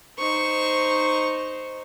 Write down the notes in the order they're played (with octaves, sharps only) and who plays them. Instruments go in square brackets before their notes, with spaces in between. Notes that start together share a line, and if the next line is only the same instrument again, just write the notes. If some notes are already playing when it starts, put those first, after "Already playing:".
[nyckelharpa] D#4 C5 [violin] C#6